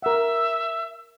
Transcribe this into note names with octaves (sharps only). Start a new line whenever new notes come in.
A#4 E5 F#5